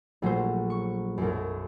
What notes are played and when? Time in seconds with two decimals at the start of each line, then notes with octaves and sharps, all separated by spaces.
0.22 A#1 F#3 A3 F#4 C5
0.70 C#6
1.18 B1 F#2